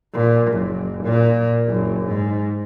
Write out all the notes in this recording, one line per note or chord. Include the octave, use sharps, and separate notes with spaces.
A#2
F#1
A#2
F#1
G#2